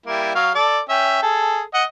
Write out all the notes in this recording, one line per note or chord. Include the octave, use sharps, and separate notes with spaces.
G3 A#3 E4
F#3 F5
A4 D5
C#4 E5 G5
G#4 A4
D#5 F#5